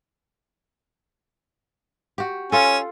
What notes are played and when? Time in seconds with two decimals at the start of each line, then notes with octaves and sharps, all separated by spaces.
2.18 F#4 G4
2.52 C#4 F4 A4 G#5